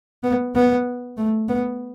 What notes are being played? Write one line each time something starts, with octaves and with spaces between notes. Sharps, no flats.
B3
B3
A3
B3